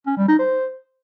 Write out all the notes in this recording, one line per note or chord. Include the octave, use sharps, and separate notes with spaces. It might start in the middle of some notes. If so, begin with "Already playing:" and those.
C#4
G3
D#4
C5